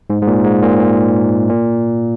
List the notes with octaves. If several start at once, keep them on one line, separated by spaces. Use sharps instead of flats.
G#2
G#2
A#2
G#2
A#2
A#2
A#2